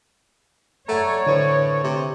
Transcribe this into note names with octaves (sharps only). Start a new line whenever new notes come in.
F#2 A3 C#5 D5 F#5 A#5
A2 D3 B4 C5
C3